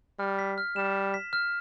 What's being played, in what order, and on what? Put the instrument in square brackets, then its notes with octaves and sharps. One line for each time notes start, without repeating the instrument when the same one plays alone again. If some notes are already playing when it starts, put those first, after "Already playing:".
[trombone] G3 [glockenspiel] F6
[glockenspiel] B6
F6
[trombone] G3 [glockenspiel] E7
[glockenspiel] F6
B6
F6